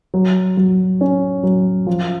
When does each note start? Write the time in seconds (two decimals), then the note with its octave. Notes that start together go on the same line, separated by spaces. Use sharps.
0.14 F#3
0.57 F#3
1.01 C#4
1.43 F#3
1.87 F3